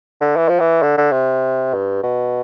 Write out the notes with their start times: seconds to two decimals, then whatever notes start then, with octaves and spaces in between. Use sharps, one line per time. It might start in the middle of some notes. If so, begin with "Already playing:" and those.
0.21 D3
0.36 E3
0.49 F3
0.60 E3
0.82 D3
0.98 D3
1.12 C3
1.74 G2
2.03 B2